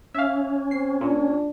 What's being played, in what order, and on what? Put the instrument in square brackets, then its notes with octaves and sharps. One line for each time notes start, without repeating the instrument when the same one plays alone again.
[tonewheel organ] C#4 [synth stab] E5 F5
[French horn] C4 [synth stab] C7
[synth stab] A#2 [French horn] D4